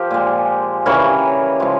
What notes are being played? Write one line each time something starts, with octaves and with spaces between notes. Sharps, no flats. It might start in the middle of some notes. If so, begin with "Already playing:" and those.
Already playing: F3 G4 A#4
A#2 G#3
C#3 E3 G3 A#4 C#5
C#3 F3 G#3